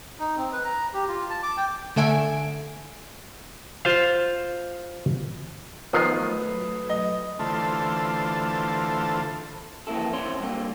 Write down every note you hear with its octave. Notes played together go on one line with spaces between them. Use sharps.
D#4
C4
B4
A#5
G4
F4
A5
D6
G5
D3 A3 A4 E5 G#5 D7
F4 C5 F5
D#3 F3 F#3 A3 B3 B4 D#6 C7
D#5
D3 E3 A3 F4 A4 C5
F2 E3 A#3 E4 A4
D#2 C4 E4 C#5 C6
G2 D3 A#3